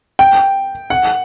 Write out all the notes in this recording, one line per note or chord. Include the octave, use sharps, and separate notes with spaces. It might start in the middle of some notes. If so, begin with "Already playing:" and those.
G5
F#5